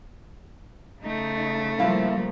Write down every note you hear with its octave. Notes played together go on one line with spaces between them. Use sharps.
C#3 A3 D#4
F3 G3 A#3 E4 F5